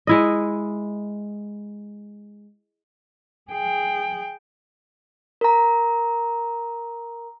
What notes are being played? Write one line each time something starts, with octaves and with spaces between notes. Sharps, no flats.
G#3 E4 D#5
G#4 G5
A#4 A#5